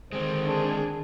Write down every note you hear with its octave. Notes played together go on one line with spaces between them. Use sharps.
D3 D#3 G#3 C4 C5
D4 G#4